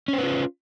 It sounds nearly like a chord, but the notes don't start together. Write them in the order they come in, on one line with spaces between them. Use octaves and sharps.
C#4 C5 B4 F4